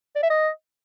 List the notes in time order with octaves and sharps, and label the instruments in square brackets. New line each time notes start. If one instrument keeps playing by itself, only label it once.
[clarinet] D5
E5
D#5